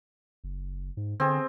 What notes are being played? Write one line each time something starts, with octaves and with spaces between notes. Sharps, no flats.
F#1
G#2
D3 C4 G#4